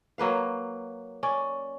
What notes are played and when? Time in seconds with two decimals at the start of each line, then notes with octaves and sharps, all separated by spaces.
0.18 F#3 A#3 B4 F5
1.23 C#4 D5